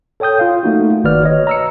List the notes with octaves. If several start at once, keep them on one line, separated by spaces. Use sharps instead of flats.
A4 C#5 G5 D#6 G6
F4 F5
A3 A#3 D#4 F#4
G1 D#3 F#4 B4 D5 F6
C#5 D#5
A#5 E6 C#7